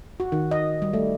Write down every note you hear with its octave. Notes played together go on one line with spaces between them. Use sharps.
F#4
D#3
D#5
G3
A3